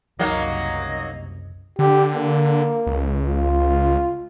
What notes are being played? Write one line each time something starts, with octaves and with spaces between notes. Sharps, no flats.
F#1 C2 F#3 A#3 D#4 D#5
D3 G4
A#3
C#2
F4